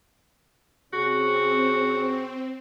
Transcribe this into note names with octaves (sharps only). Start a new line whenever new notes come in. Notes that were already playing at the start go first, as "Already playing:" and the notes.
C3 C4 C#4 F#4 G#4